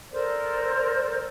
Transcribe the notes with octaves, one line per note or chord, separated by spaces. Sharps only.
A4 A#4 C5 D5